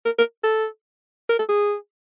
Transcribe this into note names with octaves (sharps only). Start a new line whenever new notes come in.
A#4
A#4
A4
A#4
A4
G#4